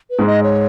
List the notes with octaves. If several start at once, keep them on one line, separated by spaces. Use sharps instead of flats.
B4
G#2 G#3
D#5
C#5